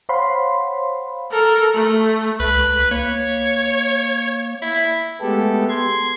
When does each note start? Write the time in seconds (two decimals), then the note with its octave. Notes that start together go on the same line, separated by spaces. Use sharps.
0.09 C5 C#5 F5 F#5 B5 C6
1.32 A4 A#4
1.74 A3
2.40 C#2 B4
2.91 A#3 C#5
4.62 E4
5.21 G#3 A3 B3 G4 A4
5.69 C6 G#6